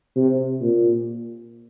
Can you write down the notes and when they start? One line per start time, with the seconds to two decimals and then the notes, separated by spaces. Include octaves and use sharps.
0.16 C3
0.61 A#2